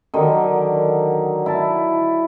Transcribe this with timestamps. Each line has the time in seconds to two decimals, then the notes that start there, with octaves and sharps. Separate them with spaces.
0.14 D3 D#3 F#3
1.46 E4 A5